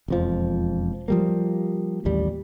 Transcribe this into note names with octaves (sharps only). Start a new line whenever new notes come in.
E1 F2 F3
F3 G3 A#3
A1 D#2 G3